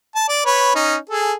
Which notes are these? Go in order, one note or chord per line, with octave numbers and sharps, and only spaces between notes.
A5
D5
B4 C#5
C#4 D#4
G#4 A4